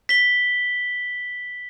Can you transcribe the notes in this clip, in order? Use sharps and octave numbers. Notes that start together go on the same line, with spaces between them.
B6 G7